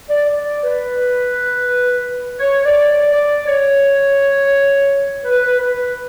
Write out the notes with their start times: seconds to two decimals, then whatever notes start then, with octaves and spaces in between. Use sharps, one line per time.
0.10 D5
0.28 D5
0.64 B4
2.40 C#5
2.65 D5
2.88 D5
3.12 D5
3.46 C#5
5.24 B4
5.61 B4